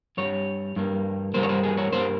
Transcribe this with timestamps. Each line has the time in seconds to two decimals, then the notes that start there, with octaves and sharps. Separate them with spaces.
0.17 G2 G3 C#5
0.76 G2 G3 A#3
1.34 G2 G3 A#3 C5
1.43 C#5
1.49 C5
1.63 G#4
1.77 C#5
1.92 G2 G3 A#3 C5